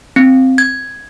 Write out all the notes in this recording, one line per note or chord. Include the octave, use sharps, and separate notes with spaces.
C4
G#6